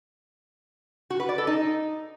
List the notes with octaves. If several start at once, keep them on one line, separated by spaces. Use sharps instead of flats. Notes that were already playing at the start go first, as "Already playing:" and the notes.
F#4
B4
D5
A4
D#4